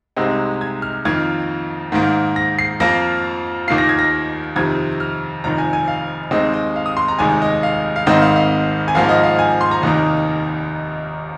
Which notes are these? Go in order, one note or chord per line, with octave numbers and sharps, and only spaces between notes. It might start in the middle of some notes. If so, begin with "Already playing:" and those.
C2 C3 G#3 C4 D#4
G#6
F6
F2 D#3 A#3 F4 G#6
G#2 D#3 A#3
A#6
C7
F2 F3 A#3 F4 A#6
D#2 D#3 A#3 F4 C7
A#6
G#6
A#6
F2 C3 D#3 G#6
F6
F1 F2 D#3 A#5
G#5
G#5
F5
D#2 D#3 G#3 C4 D#5
D#5
F5
D#6
C6
A#5
F1 D#2 D#3 G#3 G#5
D#5
F5
F5
G#1 G#2 D#3 C4 D#5
F5
F5
G#5
G#1 G#2 F3 A#3 F5
D#5
F5
G#5
C6
A#5
F1 D#2 D#3 A#3 D#4